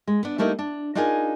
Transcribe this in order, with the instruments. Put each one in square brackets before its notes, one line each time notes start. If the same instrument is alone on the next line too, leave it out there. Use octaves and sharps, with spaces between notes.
[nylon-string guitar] G#3
B3 D4
G3 A3 A#3 D#4 E4
D4
D4 D#4 F4 G#4 A#4 G#5